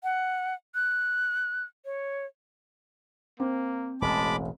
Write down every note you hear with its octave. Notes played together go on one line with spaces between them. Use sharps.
F#5
F#6
C#5
A#3 C4
E1 A1 G#3 A5 B5 D6